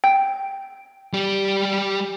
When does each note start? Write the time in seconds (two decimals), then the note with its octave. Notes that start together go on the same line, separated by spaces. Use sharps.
0.04 G5
1.14 G3 G4